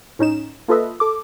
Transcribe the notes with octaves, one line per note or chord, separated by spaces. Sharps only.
A2 C#4 D#4 E7
A#3 F4 A4 B4 D#5 E5
A4 D6